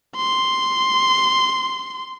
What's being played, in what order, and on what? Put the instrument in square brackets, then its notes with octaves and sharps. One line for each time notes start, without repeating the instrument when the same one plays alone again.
[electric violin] C6